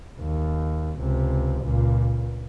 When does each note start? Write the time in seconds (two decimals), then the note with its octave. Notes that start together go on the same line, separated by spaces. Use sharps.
0.21 D#2
0.99 C#2 C3
1.62 C#2 A#2